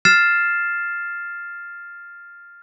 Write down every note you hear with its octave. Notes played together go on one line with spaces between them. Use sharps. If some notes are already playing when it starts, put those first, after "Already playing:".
F6 A6 C7 E7